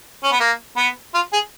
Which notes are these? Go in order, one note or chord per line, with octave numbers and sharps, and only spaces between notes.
C#4
B3
A#3
B3
F4
G#4